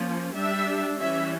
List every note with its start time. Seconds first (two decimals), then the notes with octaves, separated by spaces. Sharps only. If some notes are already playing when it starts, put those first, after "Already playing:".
Already playing: F3 A#3 C#4
0.35 G3 D4 E5
0.99 E3 G3 C#4 E5